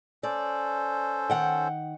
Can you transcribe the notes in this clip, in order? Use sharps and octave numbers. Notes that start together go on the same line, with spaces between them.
C#4 A4 C5 D5
D#3 F#5 G5